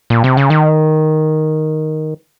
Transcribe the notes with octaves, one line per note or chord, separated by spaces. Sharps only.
A#2
C3
C#3
D#3